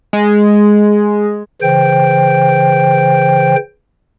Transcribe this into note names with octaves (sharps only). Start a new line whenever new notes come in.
G#3
C#3 E3 C5 G5